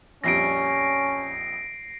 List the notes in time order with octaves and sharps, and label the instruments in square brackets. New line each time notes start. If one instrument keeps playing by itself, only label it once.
[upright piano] A#1 F2 G3 [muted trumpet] C#4 [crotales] A#6 C7 D7